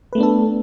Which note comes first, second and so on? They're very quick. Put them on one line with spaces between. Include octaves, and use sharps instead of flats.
B4 A3 B3 D4 A4